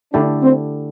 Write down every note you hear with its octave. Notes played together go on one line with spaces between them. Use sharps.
D3 A3 D4 E4 G4 D5
C4